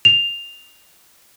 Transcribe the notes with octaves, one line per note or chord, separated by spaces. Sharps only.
F7